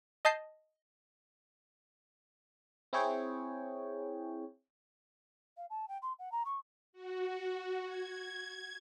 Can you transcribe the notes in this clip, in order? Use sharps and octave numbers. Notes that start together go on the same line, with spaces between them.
D#5 A5 G6 C7
C4 E4 G#4 C#5 G5
F5
A5
G5
C6
F#5
A#5
C#6
F#4
G#6